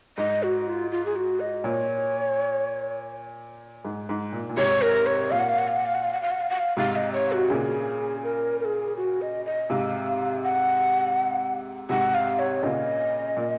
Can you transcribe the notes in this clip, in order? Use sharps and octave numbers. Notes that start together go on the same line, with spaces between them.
G#2 D#5
F#4
F4
F4
G#4
F#4
D#5
A#2 C#5
G#2
G#2
A#2
A#2
G#2 C3 C#5
A#4
C#5
A#2 F5
F#5
F5
F#5
F5
F#5
F5
F#5
F5
F#5
F5
F#5
F5
F#5
F5
G#2 C3 F5
D#5
C#5
F#4
A#2 C#3 G#4
A#4
A#4
G#4
F#4
D#5
D#5
G#2 C3 F5
F#5
G#2 C3 F#5
F5
C#5
A#2 C#3 D#5
A#2